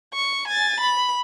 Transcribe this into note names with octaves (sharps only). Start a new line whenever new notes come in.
C#6
G#5 A6
B5